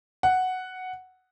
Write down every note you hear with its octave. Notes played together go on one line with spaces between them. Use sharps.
F#5